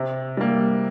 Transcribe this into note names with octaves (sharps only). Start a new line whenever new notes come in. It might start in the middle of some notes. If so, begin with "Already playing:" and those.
Already playing: C3
G3 A#3